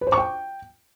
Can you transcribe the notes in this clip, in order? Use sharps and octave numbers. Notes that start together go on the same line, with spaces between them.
B4
C5
C#6
G5